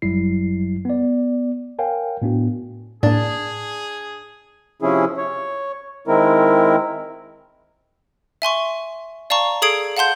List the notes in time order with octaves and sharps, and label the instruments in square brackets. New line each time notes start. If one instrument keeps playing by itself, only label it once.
[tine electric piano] G1 F#2 F#3 G3 E4 C7
B3 D5
A#4 C#5 F5 G5 G#5
A2 B3 D4 F#4
[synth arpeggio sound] A2 A#3 [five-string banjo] D4 [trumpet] G#4
[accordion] C3 F3 C#4 E4 G#4
C#5
D#3 G#3 C4 E4 A#4
[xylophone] E5 G#5 C6 C#6
D5 F5 A5 A#5 C#6
G#4 A4 D#6 G#6 C7 D7
F5 F#5 A5 C6 G6